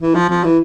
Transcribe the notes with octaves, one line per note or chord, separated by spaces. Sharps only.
E3
F3
F3
E3